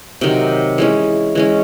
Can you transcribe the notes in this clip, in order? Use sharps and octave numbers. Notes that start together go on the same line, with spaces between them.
C3 D#3 F#3
E3 G#3 C#4
E3 G#3 C#4